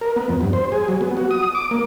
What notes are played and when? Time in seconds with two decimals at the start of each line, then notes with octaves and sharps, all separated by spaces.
0.01 A#4
0.16 B3
0.29 F2
0.41 G2
0.53 C5
0.72 G#4
0.88 F#3
1.01 B3
1.17 F#4
1.31 D#6
1.55 D6
1.71 A#3